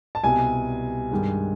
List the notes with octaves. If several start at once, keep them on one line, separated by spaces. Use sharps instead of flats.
A5
C2 B2 G3 G#5
G2 D#3 G#3